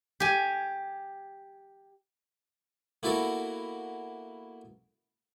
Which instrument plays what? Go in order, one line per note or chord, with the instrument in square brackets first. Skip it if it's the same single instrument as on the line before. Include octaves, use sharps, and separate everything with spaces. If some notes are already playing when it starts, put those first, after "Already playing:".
[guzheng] G4 G#5
[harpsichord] A#3 B3 E4 F#4 A4 A#4